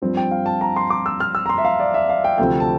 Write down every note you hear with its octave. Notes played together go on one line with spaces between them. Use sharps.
G2 F3 C4
G5
F5
A5
A#5
C6
D6
E6
F6
E6
A#5
C6
E5
F5
D5
E5
F5
G5
D2 C3 F3 C4 G5
A5